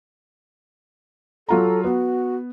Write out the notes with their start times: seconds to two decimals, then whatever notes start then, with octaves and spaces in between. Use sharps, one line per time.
1.49 F#3 F4 A4 A#5
1.84 B3 F#4